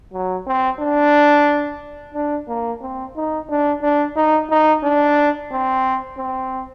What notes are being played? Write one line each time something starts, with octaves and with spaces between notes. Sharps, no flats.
F#3
C4
D4
D4
A#3
C4
D#4
D4
D4
D#4
D#4
D4
C4
C4